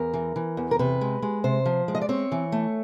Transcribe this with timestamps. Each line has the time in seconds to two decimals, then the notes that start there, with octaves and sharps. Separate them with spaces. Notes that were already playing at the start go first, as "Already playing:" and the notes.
Already playing: E2 A#4
0.14 E3
0.36 E3
0.57 E2
0.71 A#4
0.79 C3 B4
1.01 G#3
1.22 G#3
1.44 C3 C5
1.66 F3
1.88 G#3
1.95 D#5
2.02 D5
2.09 C4 C#5
2.32 E3
2.52 A3